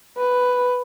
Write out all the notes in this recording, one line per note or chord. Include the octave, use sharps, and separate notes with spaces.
B4